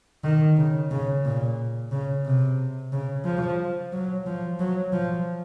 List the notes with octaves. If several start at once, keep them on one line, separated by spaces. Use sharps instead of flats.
D#3
C#3
C#3
A#2
C#3
C3
C#3
F3
F#3
F3
F#3
F3